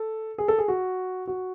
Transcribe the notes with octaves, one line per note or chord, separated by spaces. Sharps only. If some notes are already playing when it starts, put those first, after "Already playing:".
Already playing: A4
G#4
A4
G#4
F#4
F#4